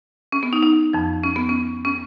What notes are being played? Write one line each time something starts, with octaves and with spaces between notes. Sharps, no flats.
C#4
B3
D#4
D#4
F2 F3
C#4
B3
C#4
C#4